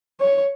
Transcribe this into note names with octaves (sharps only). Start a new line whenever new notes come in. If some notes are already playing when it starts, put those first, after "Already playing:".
C#5